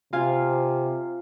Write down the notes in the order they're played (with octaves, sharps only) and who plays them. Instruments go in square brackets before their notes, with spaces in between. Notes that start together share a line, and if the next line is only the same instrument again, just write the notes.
[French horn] C3 [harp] F4 F5 G#5